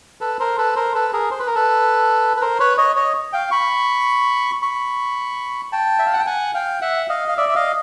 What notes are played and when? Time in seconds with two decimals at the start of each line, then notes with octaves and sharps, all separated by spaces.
0.21 A4 B4
0.40 A#4 C5
0.58 A4 B4
0.76 A#4 C5
0.95 A4 B4
1.13 G#4 A#4
1.31 C5
1.39 B4
1.47 A#4
1.55 A4 B4
2.37 B4
2.41 A#4 C5
2.60 B4 C#5
2.78 C#5 D#5
2.96 C#5 D#5
3.33 F5 G5
3.51 B5 C#6
4.62 B5 C#6
5.72 G5 A5
5.99 E5
6.06 F5
6.13 F#5
6.19 G5
6.27 F#5 G#5
6.54 F5 G5
6.81 E5 F#5
7.09 D#5 F5
7.28 F5
7.37 D5 E5
7.49 E5
7.55 D#5 F5